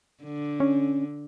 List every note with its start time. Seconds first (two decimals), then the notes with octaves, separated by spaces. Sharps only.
0.23 D3
0.60 C#4